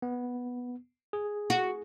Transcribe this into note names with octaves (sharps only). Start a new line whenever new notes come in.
B3
G#4
F#4